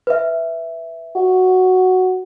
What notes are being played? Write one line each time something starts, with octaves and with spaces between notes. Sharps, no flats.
B4 E5
F#4